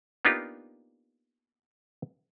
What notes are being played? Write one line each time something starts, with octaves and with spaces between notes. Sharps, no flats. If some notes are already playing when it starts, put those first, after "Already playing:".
A#3 B3 D4 D#4 F4 G4